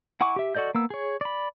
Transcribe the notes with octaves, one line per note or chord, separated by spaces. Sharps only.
E4 F#5 G#5 C#6 D6
G4 E5
F#4 A4 D5 D#5 G6
A#3 B3 E6
G#4 C#5
D5 B5